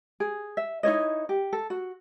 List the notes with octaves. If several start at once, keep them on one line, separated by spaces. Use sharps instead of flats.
G#4
E5
D#4 E4 C#5 D#5
G4
A4
F#4